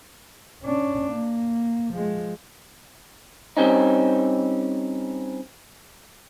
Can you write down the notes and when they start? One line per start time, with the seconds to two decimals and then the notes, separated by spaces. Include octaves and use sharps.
0.63 C#4 D4
1.12 A#3
1.93 F3 G#3
3.57 G3 C4 C#4 D#4